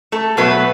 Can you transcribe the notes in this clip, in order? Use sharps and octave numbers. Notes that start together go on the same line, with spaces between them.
A3 A4
B2 F#3 A3 B3 B4